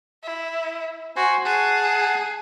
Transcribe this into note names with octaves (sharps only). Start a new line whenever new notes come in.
E4
F#4 C5 G#5
G#4 F#5 A5